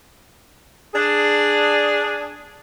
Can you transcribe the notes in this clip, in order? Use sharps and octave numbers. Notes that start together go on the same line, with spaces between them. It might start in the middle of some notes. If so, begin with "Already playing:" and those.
D4 G#4